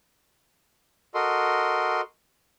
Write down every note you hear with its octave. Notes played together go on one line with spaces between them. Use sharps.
F#4 A4 A#4 D#5 C6